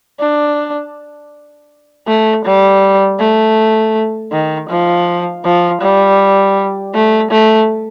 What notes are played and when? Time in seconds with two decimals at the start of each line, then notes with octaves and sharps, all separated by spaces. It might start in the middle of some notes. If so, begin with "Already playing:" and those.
0.20 D4
2.07 A3
2.45 G3
3.19 A3
4.32 D#3
4.69 F3
5.44 F3
5.82 G3
6.94 A3
7.31 A3